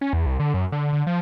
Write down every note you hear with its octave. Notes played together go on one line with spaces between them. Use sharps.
C#4
E2
C2
D3
F#2
D3
D3
F3